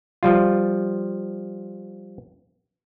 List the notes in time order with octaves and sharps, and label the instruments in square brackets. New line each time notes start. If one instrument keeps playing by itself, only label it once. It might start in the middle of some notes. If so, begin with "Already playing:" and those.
[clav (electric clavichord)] F3 G3 F4